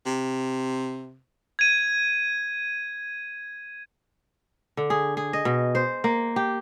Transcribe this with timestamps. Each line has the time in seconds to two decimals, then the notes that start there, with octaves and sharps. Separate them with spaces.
0.06 C3
1.59 G#6 D#7
4.77 D3
4.90 G#4
5.17 G#4
5.33 D#5
5.45 B2
5.75 C5
6.04 A#3
6.36 G4